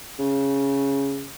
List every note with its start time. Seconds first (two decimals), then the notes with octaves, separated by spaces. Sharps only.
0.19 C#3